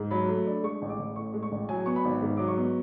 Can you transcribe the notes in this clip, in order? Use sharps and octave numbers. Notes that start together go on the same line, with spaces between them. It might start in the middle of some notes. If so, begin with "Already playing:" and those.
Already playing: G#2
F#3 B5
A3
D4
G#3 C#6
A1
D6
A1
A2 C#6
G#3
C#6
A1
F#3 G#5
B3 C#6
B5
G#1
G#2
F#3 D6
C#6
B3